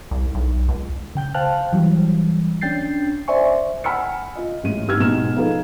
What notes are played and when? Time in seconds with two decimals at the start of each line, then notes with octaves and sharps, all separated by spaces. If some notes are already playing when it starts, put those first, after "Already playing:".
0.11 C2
0.35 B1
0.68 C#2
1.15 C#3 G5 G6
1.34 C5 F5 G5 A5 F6 F#6
1.73 E3 F#3 G3
2.61 C#4 D4 G5 G6 A6 C7
3.28 C5 D5 E5 G#5 C#6
3.84 F#5 G#5 B5 E6 F6 C#7
4.36 F4 D#5
4.63 A1 G#3 C#4 D#7
4.87 G#1 D#4 G4 E6 F6 G#6
5.00 B2 G#3 B3 D#4 F6 E7
5.36 F3 D#4 G#4 A4 B4 F5